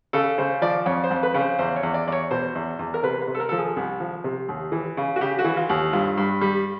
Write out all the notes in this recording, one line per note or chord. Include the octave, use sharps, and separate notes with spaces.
C#3 A4
C#3 C5
F3 D5
F2 C#5
C5
F2
B4
C#3
C5
E2 C5
C#5
E2
D5
E2 D5
C#5
B2 C5
E2
E2
A#4
C3 B4
B4
C3
A4
A#4
F3 A4
G#4
C2
F3
C3
D#2
E3
C#3
F#4
C#3 G4
F#4
E3
F4
D#2
G2 F4
G2
G3